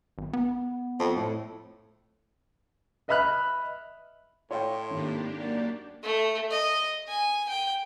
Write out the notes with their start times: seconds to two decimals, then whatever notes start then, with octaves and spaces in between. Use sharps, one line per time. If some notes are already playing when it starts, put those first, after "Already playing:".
0.18 G#1
0.33 B3
1.00 F2
1.16 A2
3.08 B4 D#5 E5 B5 F6 F#6
4.51 A2 C#5 F5 G5 C6
4.90 G#1 A#3 D4 G4
5.37 F#2 D5
6.03 A3
6.51 D#5
7.08 G#5
7.49 G5